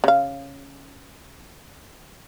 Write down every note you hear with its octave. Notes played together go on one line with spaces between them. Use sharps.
C#3 F5